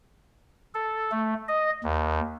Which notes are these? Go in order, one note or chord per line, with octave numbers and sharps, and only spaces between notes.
A4
A3
D#5
D#2